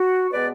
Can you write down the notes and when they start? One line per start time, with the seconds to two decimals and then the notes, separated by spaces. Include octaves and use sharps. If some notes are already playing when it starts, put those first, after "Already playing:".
Already playing: F#4
0.32 B2 G#3 B3 B4 D5